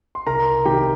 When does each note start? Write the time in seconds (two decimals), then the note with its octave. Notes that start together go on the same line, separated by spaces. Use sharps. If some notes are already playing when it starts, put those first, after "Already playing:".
0.15 C6
0.27 C2 A#4 A#5
0.65 C3 D#3 G4 G5